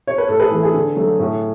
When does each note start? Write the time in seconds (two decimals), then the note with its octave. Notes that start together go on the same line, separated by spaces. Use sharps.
0.07 C#5
0.18 B4
0.28 A2 A4
0.40 G#4 B4
0.51 E3 A3
0.63 G#4
0.74 D3
0.96 F#3 A3
1.19 A2